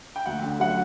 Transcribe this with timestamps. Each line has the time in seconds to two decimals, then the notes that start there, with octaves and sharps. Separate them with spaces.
0.16 G5
0.26 D2 F#5
0.44 D3
0.60 F#3 F#5